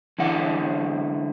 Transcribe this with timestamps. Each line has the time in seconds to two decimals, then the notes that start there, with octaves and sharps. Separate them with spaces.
0.19 D3 E3 G#3 F#5